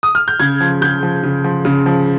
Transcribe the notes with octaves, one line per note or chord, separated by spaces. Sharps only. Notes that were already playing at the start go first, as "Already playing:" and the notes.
D#6
F6
G6
C#3 G#6
F3
C#3 G6
F3
C#3
F3
C#3
F3